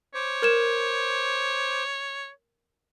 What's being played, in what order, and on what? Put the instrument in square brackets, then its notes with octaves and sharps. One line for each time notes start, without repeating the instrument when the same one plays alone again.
[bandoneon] C5 D6 [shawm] C#5
[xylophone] A#4 G#6 E7